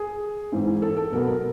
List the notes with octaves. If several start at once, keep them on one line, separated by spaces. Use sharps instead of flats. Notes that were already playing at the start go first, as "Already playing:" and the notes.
Already playing: G#4
G#2 E3 G#3 C4
A4
A4
B2 F#3 B3 A#4
A#4